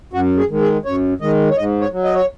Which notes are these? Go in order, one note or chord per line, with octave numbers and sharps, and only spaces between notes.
F#2 F#4
G#4
D#3 G#3
G#4
F#2 C#5
D#3 G#3 D#5
C#5
G#2 D#5
C#5
F#3
D#5
C#5